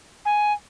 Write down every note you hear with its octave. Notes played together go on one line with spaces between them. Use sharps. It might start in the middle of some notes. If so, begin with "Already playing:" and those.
G#5